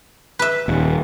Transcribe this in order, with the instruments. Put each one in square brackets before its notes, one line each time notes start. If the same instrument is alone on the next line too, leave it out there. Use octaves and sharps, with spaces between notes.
[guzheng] B4 E5
[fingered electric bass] D#1